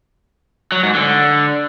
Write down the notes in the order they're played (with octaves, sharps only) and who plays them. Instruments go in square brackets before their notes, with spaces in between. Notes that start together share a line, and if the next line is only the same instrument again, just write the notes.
[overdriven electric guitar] F#3
G#2
D3